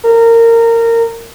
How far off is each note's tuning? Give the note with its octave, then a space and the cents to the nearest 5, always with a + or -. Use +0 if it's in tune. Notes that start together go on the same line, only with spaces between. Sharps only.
A#4 -20